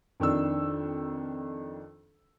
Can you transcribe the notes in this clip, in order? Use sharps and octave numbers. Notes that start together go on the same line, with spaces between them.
F2 D#3 D4 E6